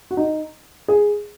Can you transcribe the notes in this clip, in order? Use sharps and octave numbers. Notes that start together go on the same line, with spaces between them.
F#4
D#4
G#4